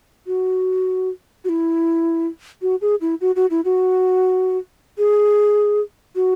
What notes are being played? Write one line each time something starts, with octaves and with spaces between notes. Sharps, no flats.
F#4
F#4
E4
F#4
G#4
E4
F#4
F#4
E4
F#4
G#4
F#4